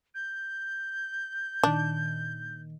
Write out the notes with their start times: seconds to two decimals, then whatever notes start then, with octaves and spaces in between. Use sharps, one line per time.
0.15 G6
1.63 A#2 D#3 D4